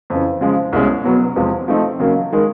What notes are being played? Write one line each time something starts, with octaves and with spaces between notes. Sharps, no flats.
F2 C#3 E3
C#3 F3 G#3
C2 B2 G#3 C#4
B2 F#3 B3
E2 C3 F3 G#3
F3 A3 C4 D#4
C#3 F#3 A#3
D#3 G#3